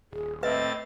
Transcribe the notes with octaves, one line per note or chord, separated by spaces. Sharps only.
D#1 G#4
A2 C4 B4 D#5 E5 A6